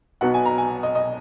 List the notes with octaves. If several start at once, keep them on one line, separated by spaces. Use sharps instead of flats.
B1 B2 F#3 B3 D#4 F#5
G#5
A#5
G#5
D#5
D#5